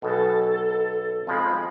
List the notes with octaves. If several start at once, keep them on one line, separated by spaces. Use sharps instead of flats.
B1 B2 A4
F2 F3 G#3 B5